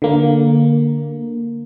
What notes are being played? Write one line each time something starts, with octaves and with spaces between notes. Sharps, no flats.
D3 A#3